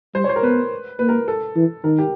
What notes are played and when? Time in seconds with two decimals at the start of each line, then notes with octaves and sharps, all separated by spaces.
0.15 G3 C5
0.24 C#5
0.29 C5
0.36 A#4
0.43 B3 B4
0.99 A#3 B4
1.09 A#4
1.28 A4
1.56 E3
1.84 D#3 A#4
1.99 G4